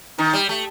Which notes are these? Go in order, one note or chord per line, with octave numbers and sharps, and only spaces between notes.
D#3 D#4
G3
A3